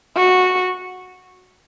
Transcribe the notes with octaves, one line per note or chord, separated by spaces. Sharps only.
F#4